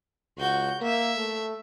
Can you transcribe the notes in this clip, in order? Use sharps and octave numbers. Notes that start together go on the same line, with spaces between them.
C#2 F#4 G6
A#3 E5
A3